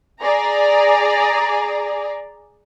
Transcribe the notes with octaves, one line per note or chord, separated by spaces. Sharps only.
G#4 D5 A#5